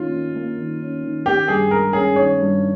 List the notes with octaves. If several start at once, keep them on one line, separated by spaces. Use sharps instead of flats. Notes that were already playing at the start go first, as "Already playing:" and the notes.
Already playing: D#3 A#3 C#4 F4
D#3
A#3
D#3
C#4
D#3
D#3 G4
G2 G#4
G#3 A#4
C#4 G#4
D#3 C#5
G2